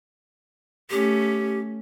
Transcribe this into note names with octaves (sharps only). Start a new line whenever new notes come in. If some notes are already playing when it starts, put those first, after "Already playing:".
A3 C#4 G4